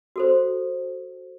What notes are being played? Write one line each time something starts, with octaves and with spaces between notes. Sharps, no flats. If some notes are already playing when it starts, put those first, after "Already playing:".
F#4 A4 C5